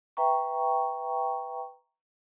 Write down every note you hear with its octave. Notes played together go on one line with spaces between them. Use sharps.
B4 E5 G5 A#5 C#6